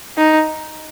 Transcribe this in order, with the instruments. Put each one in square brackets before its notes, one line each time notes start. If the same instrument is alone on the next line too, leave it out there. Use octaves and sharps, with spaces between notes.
[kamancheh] D#4